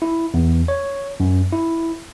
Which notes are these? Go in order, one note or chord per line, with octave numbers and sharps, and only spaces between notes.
E4
E2
C#5
F#2
E4